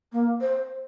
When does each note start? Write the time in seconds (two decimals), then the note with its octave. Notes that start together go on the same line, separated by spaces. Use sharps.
0.12 A#3
0.41 C5